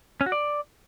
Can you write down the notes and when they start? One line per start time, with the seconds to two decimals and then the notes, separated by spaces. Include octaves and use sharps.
0.21 C#4
0.26 F#4
0.32 D5